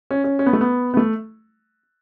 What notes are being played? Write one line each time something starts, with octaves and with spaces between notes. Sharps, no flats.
C#4
C#4
C#4
B3
A3
B3
B3
A3